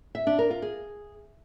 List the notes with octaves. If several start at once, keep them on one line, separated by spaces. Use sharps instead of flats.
E5
D4
A#4
F4
G#4